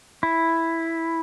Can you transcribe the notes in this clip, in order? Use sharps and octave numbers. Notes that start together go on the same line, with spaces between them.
E4